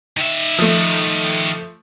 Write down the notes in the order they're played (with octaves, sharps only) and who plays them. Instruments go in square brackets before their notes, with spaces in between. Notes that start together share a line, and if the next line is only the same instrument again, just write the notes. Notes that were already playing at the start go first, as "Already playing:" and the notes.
[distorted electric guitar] D#3 E5
[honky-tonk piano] F3 A3